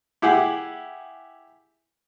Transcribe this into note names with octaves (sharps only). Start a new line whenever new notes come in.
E4 G4 G#4 F#5